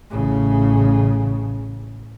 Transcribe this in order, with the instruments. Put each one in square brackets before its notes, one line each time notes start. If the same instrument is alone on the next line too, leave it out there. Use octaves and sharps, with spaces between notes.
[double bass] A1 C#3